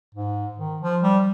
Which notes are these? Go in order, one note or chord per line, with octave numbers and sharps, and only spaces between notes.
G#2
D#3
F3
G3